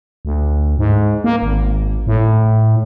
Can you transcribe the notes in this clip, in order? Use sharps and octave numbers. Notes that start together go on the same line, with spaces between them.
D2
G#2
A#3
G#1
A2